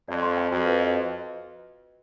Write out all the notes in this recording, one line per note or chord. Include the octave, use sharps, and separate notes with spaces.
F2 D5
C6
G5
F2 F#4
B4
D#5